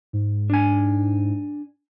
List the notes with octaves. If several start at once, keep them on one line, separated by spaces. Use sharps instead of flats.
G#2
D4 G#5